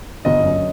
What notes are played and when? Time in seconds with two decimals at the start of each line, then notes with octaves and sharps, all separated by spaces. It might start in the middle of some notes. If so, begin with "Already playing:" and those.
0.25 G1 D#5
0.44 F#2